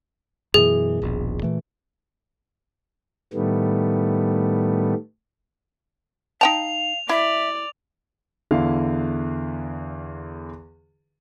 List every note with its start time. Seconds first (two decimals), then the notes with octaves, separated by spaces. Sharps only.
0.54 F#2 B2 E3 G#4
1.02 D#1 A#1 B2
1.43 A#2 E3 A3
3.33 A2 D#3 G3 A3 B3
6.41 D#4 F5 G5 A5 F7
7.09 E4 D5 E5
8.51 E2 D3 E4 F5